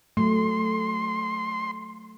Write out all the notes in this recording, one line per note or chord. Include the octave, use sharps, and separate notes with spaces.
F#3 A3 C6